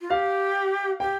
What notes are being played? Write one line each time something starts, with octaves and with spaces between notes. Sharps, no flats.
F4
G4 F5
G4 G5